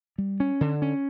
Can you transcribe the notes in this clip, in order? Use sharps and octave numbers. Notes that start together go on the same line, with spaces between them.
G3
C#4
D3
C#4